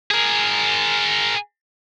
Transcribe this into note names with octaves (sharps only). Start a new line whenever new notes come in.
G#4 A#4